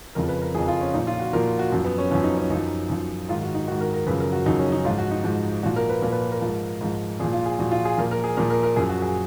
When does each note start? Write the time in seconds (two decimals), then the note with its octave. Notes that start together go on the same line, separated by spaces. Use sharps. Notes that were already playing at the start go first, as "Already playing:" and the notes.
0.15 F2 C#3 F3 A#4
0.29 B4
0.42 A#4
0.54 F2 C#3 F3 G#4
0.68 F4
0.81 C#4
0.94 A#2 F3 D#4
1.07 F4
1.20 F#4
1.33 A#2 F3 A#4
1.59 F#4
1.72 F#2 F3
1.85 B3
1.98 C#4
2.11 F#2 F3 C#4
2.24 D#4
2.37 C#4
2.50 F#2 F3 D#4
2.90 F#2 F3
3.29 G#2 D#3 F4
3.42 F#4
3.54 D#4
3.68 D#3 F#4
3.72 G#2
3.81 A#4
3.94 A#4
4.07 F#2 C#3 F3 B4
4.20 A#4
4.33 F#4
4.46 F#2 C#3 F3 D#4
4.59 C#4
4.72 D#4
4.85 G#2 F4
4.89 F3
4.98 F#4
5.11 D#4
5.24 G#2 F3
5.63 A#2 F3 F#4
5.76 A#4
5.89 B4
6.02 A#2 F3 A#4
6.12 B4
6.32 A#4
6.41 G#2 F3
6.81 G#2 F3
7.20 A#2 G#4
7.24 F3
7.33 F4
7.46 G#4
7.59 A#2 F3 F#4
7.71 F4
7.85 G#4
7.98 A#2 F3 A#4
8.11 A#4
8.24 G#4
8.37 A#2 F3 A#4
8.50 A#4
8.63 A#4
8.76 F#2 F3 G#4
8.89 F#4
9.02 G#4